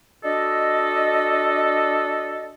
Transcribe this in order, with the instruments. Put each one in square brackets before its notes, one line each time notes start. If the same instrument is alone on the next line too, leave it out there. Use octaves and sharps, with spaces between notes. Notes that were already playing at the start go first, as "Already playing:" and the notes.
[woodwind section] D4 F#4 A4 D#5